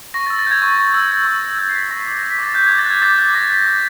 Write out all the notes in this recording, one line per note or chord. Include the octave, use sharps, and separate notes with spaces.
C#6 A#6
A6
E6
A6
G6 G#6
C#6
C#6
E6
G6
C#6
C#6
E6 G6
C7
G6 B6
C#6 A#6
D6 A6
F#6 A#6
B6
D6 A6
F#6 G6
D6 G#6
A6
F#6 G#6
D6 A6
F#6 A6
D6 A#6
F#6 B6
D6